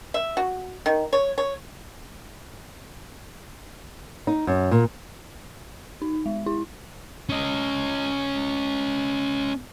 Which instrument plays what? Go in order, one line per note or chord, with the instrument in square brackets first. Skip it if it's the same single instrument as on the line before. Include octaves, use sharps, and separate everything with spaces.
[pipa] E5
F#4
D#3
C#5
C#5
[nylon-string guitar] D#4
F#2
A#2
[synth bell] D#4
G#3
E4
[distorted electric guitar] C#4 D#5